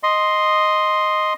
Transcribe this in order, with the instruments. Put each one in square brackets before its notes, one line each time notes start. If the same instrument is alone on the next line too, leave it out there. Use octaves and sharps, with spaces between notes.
[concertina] D#5 C6